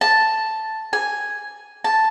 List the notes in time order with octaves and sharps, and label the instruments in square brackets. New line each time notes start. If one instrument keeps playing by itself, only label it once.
[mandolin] A5
G#5
A5